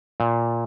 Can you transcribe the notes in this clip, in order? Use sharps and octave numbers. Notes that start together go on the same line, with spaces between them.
A#2